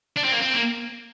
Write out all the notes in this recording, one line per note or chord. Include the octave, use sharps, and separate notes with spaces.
D4
C4
A#3
C4
A#3